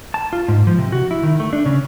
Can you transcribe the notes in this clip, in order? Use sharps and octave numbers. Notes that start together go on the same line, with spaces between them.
A5
F4
G#2
F3
C3
F#4
E4
D#3
A3
D4
C#3